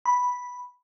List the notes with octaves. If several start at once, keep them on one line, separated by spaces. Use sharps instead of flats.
B5